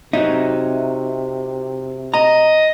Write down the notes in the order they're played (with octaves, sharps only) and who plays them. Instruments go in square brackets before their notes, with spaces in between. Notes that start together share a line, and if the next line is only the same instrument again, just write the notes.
[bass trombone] C3 [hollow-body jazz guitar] D#4 [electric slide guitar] F#4 C#5 E5
[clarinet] D#5 [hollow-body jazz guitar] A#5